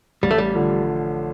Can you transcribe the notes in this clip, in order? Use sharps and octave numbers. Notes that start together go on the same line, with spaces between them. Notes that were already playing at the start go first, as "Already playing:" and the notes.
A1 G3
A3
G3
D3 F3